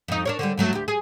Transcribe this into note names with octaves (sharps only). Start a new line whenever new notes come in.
F2 D#4
D4 A#4 C#5
D3 G3
G2 F#3 A3
D2 G4
G#4